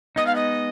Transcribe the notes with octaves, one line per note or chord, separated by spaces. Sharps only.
G#3 B3 D#4 D#5
F5
D#5